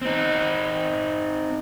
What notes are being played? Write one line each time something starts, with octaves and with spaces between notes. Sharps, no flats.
C4 D#4